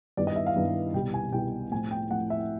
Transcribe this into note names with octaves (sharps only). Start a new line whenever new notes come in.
G2 D#3 G3 B3 E4 D5
D#5
E5
F5
G2 D#3 G3 B3 E4
C2 B2 G3 G5
G#5
C2 B2 G3 G5
A2 F3 A3 C4 G#5
G5
A2 F3 A3 C4 F#5
E5